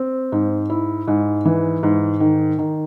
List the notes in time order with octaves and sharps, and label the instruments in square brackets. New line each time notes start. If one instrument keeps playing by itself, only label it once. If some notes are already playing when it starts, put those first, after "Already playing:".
Already playing: [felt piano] C4
G#2
E4
G#2
E3
G#2
D#3
D#3